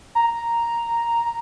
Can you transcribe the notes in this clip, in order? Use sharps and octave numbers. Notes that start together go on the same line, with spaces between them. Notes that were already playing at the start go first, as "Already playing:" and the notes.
A#5